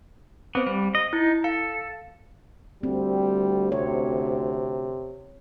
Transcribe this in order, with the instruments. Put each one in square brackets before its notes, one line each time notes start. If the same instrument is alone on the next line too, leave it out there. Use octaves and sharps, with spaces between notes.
[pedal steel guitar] B3 [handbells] C4 C5
[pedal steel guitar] G3 [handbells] C5
[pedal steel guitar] D#5
[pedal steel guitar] D#4 [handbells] E4
[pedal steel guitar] A4 [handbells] F5
[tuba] D2 [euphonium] G3 [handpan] C4
[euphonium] C3 [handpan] C#5